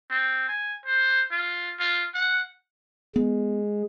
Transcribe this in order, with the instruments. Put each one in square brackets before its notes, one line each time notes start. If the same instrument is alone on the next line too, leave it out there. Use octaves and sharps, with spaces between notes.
[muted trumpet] C4
G#5
C5
F4
F4
F#5
[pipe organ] G#3 [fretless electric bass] B3